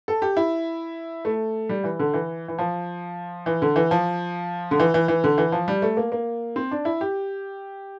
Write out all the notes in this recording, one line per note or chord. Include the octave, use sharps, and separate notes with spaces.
A4
G4
E4
A3
G3
E3
D3
E3
E3
F3
E3
D3
E3
F3
D3
E3
E3
E3
D3
E3
F3
G3
A3
A#3
A#3
C4
D4
E4
G4